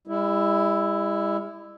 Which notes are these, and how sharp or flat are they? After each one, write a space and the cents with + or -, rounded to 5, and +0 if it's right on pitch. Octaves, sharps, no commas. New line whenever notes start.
G3 +45 E4 +0